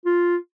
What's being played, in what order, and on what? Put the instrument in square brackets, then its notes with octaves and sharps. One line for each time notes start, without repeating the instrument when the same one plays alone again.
[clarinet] F4